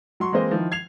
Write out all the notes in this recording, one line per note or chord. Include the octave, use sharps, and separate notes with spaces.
F#3 C6 C#6
E3 G#3 A#3 C4 C5 D#5
D#3 F3 E4
G#6 C7 F7